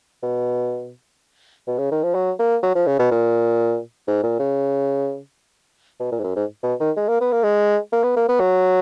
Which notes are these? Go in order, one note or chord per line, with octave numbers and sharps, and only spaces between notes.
B2
B2
C#3
D#3
F3
F#3
A#3
F#3
F3
C#3
B2
A#2
G#2
A#2
C#3
B2
A#2
G#2
F#2
G#2
B2
D#3
G#3
A#3
B3
A#3
G#3
A#3
B3
A#3
B3
F#3